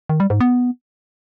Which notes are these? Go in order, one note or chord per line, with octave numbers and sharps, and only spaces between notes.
D#3
G3
G#2
B3